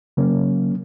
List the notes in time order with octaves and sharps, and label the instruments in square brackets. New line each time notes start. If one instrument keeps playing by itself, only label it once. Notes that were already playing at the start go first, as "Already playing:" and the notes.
[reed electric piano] C#3 F#3 A#3 C#4